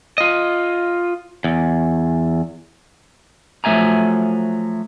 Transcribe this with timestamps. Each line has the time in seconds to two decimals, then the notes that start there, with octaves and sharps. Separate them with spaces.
0.18 F4 D#5
1.44 E2
3.64 F3 F#3 A3 E5 G#5 A#5